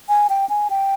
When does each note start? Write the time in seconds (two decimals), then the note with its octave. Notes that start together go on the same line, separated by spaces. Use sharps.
0.09 G#5
0.30 G5
0.49 G#5
0.70 G5